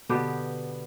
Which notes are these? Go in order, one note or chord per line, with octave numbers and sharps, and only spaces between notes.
B2 D3 B3 G4